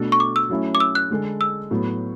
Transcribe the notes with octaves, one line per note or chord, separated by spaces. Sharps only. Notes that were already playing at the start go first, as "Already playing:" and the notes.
Already playing: B2 A3 D4 F#4 A4
C#6
D6
E6
F#3 A3 C#4 E4
D6
E6
F#6
D3 G#3 D4 A4
E6
A2 F#3 B3